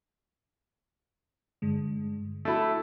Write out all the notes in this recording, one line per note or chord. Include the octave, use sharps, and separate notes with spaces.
G2 D3 G#3
A3 D4 E4 F#4